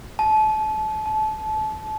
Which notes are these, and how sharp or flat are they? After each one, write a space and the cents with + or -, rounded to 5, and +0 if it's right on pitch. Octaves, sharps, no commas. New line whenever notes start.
A5 -30
A5 -25